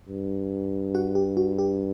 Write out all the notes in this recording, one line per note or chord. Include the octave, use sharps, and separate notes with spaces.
G2
F#4 F#5
G4
F#4
G4